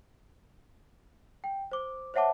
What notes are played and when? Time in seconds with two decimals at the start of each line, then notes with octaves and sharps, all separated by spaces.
1.44 G5
1.72 C5 D6
2.14 C5 C#5 E5 F#5 A5 D6